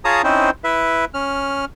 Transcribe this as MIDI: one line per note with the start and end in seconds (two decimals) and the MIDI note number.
0.05 0.22 65
0.05 0.22 68
0.05 0.22 73
0.05 0.22 81
0.05 0.22 82
0.05 0.22 87
0.24 0.50 60
0.24 0.50 61
0.24 0.50 63
0.24 0.50 64
0.24 0.50 72
0.64 1.05 64
0.64 1.05 71
0.64 1.05 76
1.14 1.65 61
1.14 1.65 89